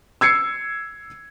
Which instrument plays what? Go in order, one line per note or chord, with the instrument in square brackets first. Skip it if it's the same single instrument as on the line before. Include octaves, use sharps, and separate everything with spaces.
[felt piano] E6 G#6 C7 C#7